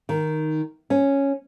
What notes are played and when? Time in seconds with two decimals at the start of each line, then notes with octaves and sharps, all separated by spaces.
0.09 D#3
0.90 C#4